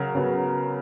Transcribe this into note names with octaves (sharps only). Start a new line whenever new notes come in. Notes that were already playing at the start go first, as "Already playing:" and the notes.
Already playing: C#3 F#3 A#4
C#3 F#3 B3